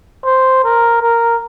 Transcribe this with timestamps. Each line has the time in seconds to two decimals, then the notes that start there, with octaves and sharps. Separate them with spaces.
0.25 C5
0.64 A#4
1.02 A#4